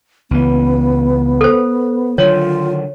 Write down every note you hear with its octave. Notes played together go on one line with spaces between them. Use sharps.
C#2 E3 B3
A4 C5
D3 D#3 F#3 F4 C#5